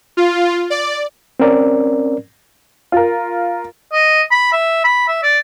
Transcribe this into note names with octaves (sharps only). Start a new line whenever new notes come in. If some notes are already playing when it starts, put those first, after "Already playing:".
F4
D5
C4 C#4 A#4 D5
F4 A#4
D#5
B5
E5
B5
E5
D5